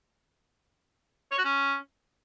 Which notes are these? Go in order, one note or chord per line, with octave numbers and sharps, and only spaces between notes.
C#5
F#4
C#4